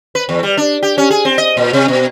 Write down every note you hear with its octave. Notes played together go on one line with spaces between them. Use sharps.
B4
E2
G3
D4
G4
C#4
G#4
C4
D#5
A#2
C3
B2